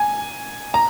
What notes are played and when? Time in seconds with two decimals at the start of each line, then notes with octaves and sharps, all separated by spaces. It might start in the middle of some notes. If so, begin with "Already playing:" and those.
Already playing: G#5
0.74 A#5